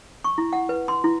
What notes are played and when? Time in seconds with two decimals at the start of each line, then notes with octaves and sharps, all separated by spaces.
0.24 C#6
0.38 E4
0.53 F#5
0.69 B4
0.88 C6
1.04 E4